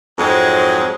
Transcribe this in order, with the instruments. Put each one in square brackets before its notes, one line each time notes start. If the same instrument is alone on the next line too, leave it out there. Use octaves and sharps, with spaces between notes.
[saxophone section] F2 G#2 F#3 G#3